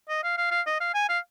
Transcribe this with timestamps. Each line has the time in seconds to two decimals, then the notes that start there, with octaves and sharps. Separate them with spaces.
0.09 D#5
0.23 F5
0.38 F5
0.51 F5
0.67 D#5
0.80 F5
0.94 G#5
1.09 F5